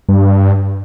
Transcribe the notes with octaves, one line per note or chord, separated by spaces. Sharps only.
G2